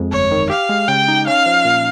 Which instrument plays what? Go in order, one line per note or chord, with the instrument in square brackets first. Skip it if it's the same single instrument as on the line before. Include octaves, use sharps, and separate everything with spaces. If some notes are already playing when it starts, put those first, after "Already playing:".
Already playing: [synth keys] F2 G#3
[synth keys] G1 [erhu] C#5
[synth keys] D#3
[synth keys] G4 [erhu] F5
[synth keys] G#3
[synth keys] C#3 [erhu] G5
[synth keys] D#4
[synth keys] C#4 [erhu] F5
[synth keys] F3
A#2